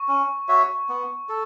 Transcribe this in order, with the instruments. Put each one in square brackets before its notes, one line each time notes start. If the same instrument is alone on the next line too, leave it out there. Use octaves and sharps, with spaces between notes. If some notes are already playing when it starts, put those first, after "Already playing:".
Already playing: [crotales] C#6
[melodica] C#4
F#4 C#5 E5
B3
A4